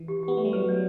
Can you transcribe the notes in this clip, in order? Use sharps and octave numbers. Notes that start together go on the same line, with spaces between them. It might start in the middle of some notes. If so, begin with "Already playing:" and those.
Already playing: E3
G4
G4
B3
A3 G4
G3
F#3 B4
D5